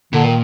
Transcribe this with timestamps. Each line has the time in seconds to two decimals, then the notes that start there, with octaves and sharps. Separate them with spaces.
0.13 A#2 D3
0.25 D#3